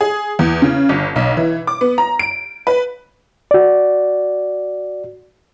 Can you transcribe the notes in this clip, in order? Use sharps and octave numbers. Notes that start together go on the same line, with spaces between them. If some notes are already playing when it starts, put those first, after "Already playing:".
G#4
E2
C#3
G1
B1
E3
D6
B3
A#5
D7
B4
F#4 D5